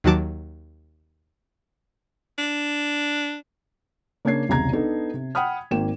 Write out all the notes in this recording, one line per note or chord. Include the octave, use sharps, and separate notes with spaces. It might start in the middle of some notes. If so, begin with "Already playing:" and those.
D#2 D#3 F#3 A5 D6
D4
C#3 A#3 D4 C#5 G#6 C7
E1 C2 C#3 A#5 G#6
B3 D4 D#4 A4
C3
F#5 G5 B5 D#6 F6
G#1 A#3 G5 E7